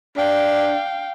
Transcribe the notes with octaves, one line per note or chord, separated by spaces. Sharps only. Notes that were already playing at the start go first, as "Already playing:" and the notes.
D4 F5 G5